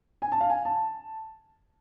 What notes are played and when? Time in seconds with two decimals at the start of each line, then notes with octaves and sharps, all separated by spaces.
0.22 G#5
0.32 A5
0.41 F5
0.50 G#5
0.65 A5